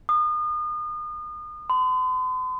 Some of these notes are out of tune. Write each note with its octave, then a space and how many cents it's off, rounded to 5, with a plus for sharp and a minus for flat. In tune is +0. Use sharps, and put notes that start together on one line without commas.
D#6 -35
C6 -45